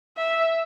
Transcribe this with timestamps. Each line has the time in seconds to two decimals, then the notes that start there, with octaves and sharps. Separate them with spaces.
0.17 E5